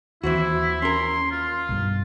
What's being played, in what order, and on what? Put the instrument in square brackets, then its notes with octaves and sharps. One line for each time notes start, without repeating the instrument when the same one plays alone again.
[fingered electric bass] D#2 [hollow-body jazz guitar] E3 C4 F#4 [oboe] E4
[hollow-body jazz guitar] C#4 A#4 [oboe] C6
[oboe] F4
[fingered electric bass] B1 G2